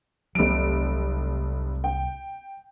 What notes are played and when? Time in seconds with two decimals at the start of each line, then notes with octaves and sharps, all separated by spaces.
0.35 F1 C2 F#3 D7
1.84 G5